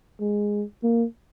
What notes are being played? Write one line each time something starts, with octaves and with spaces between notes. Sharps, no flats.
G#3
A#3